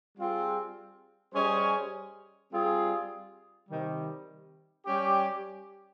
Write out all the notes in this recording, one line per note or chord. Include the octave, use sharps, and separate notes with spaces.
G3 C4 F4 G#4
G3 C#4 G#4 C5 D#5
G3 C4 F4 G#4
C3 D#3 G3
G3 C#4 G4